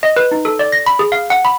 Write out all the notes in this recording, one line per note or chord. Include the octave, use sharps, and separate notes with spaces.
D#5
B4
D#4
A4
D5
A#6
B5
G#4
F5
F#5
B5